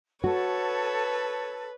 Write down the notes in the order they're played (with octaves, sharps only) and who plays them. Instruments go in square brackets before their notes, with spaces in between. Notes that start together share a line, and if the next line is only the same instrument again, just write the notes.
[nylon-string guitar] F#4 [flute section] A4 [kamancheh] B4 [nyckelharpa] C#5